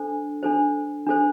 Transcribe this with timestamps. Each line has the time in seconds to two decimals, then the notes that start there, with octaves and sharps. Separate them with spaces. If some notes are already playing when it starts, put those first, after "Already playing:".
Already playing: D4 A4 C5
0.43 D4 A4 C5
1.07 D4 A4 C5